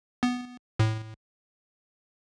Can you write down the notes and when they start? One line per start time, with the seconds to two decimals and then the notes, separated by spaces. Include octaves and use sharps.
0.23 B3
0.79 A2